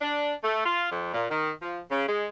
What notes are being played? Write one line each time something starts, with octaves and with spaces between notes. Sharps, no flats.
D4
A3
F4
F2
A#2
D#3
F3
C#3
G#3